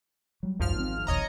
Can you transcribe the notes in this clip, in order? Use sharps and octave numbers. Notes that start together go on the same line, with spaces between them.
F#3 G3
G#1 C#2 F#2 F3 F6
A#3 C4
E1 A#1 D#2 C#5 D#5 A#5